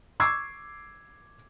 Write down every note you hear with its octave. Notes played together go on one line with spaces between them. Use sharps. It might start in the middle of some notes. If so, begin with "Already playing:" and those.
C#6 D6 E6 G#6 C7